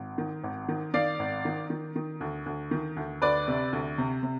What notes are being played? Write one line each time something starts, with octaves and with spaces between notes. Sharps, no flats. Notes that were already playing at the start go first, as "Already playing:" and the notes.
Already playing: G#1
D#3
G#1
D#3
D#3 D5 F5
G#1
D#3
D#3
D#3
D2
D2
D#3
D2
D2 B4 D5
C3
D2
C3
C3